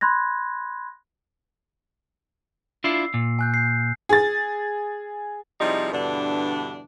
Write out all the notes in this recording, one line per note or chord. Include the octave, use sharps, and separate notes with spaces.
B5 C6 F#6 G#6 A#6
D4 E4 F4 E6 C7
A#2
G#5 F#6 G6
G6 C7
G#4 A6
C3 F3 G3 D#4 E4 G#4
G2 B2 D3 E3 D4